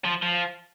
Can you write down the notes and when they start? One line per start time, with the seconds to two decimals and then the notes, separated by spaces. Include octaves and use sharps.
0.04 F3
0.22 F3